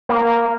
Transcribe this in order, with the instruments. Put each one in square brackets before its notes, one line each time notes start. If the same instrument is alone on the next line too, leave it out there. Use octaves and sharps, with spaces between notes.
[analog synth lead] A#3